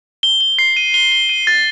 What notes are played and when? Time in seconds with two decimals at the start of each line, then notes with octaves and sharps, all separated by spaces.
0.23 G7
0.41 G7
0.59 C7
0.77 D#7
0.94 G7
1.12 G7
1.29 D#7
1.47 A6